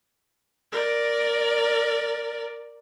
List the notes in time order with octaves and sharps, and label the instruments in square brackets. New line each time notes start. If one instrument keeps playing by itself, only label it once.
[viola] A#4 D5